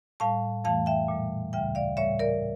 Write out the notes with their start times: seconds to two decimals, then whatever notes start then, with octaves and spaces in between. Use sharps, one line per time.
0.20 A2 G3 F5 A5
0.64 F2 E3 A3 F5 A5
0.86 E5 G5
1.08 A#2 G3
1.53 D2 C#3 G3 E5 G5
1.75 D5 F5
1.97 A2 G3 C#5 E5
2.19 A#4 D5